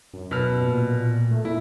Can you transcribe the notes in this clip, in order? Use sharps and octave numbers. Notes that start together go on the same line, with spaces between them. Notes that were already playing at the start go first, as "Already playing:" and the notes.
F#2
B2 F6
A#2
A3
A#2 E4